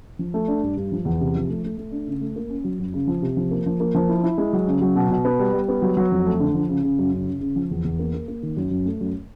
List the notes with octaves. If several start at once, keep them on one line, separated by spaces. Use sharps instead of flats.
F3
A3
D4
G2
G2
F3
E2
C3
F3
A3
A3
A3
D4
C#3
A3
A#3
C#4
F#3
F#2
C#3
F3
C3
F3
A#3
F3
A#3
F3
E4
E4
G#3
F#3
C#3
F#3
B2
B2
B3
G3
G3
B3
F#3
F#3
F2
A3
D3
F3
C#3
C#3
F#2
C#3
C#3
C#3
F3
E2
E2
A#3
A#3
A#3
D#3
F#2
F#2
A3
F#2